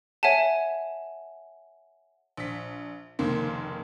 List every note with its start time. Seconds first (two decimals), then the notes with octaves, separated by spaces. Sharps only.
0.23 C#5 E5 F#5 G#5 A5
2.37 A#1 B6
3.19 F1 C#2 D#3 A#3 C6